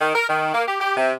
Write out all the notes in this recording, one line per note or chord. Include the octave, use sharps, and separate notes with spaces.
D#3
A#4
D#3
A#3
G4
G4
C3